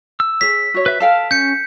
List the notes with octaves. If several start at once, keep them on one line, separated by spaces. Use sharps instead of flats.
E6
G#4 C#5 B6
F#4 C#5
B4 E5
A4 F5 G5 A5 F6
C#4 G6 C#7